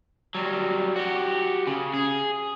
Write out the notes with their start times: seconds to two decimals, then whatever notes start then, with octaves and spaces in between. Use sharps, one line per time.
0.35 F#3 G3
0.96 F#4 G4
1.67 C#3
1.94 G#4